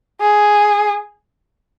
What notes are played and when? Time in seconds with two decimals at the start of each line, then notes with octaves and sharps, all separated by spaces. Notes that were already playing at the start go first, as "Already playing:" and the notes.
0.21 G#4